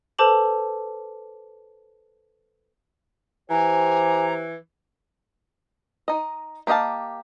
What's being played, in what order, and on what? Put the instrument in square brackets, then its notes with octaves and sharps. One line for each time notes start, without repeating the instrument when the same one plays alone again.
[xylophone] A4 B4 C5 A5 D6 F#7
[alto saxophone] E3 [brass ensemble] G4 C5 [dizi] G#5 [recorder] A#5
[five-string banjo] D#4 D#5
A#3 G4 D#5 F5 A5